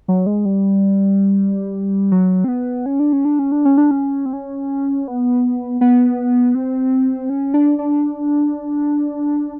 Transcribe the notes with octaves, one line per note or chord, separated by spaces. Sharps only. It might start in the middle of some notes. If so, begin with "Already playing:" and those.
F#3
G#3
G3
F#3
C4
B3
C#4
D4
C#4
D4
C#4
D4
C#4
D4
C#4
C4
C#4
B3
B3
C4
C#4
D4
D4